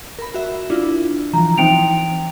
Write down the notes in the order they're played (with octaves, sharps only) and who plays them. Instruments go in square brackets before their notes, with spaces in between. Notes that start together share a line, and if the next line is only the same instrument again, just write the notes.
[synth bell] A#4 B5
F#4 E5
D4 E4 F4
[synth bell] E3 F3 [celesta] A#5
[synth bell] E3 C4 D#4 [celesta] G5 D7 F7